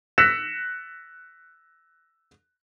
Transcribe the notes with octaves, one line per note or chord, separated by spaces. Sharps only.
E6 F#6 A#6 B6 C#7 E7